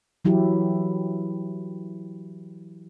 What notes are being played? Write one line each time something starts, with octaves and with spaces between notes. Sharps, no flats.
E3 F#3 E4 G4